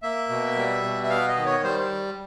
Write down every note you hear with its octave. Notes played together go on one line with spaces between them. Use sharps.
A#3 E5
B2
G3
B2
E5
B3 F5
D#5
D#3
C#5
G3 C5